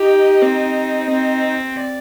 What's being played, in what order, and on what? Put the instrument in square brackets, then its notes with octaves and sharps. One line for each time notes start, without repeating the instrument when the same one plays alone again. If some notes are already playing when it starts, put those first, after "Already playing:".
Already playing: [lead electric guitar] D#4 [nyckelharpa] G4
[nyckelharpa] C4
C4
[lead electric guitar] D5